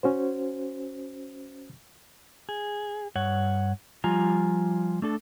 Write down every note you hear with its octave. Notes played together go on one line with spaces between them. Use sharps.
C#4 F#4 C5
G#4
G2 C#5 F#5
F3 G3 F4 G#5 A#5
A3 D4 A4